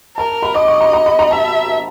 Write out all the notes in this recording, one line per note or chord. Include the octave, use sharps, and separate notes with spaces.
A#4 A5
B5
D#5 D6
C#6
A#5
A#5
B5
A#5
E5 A5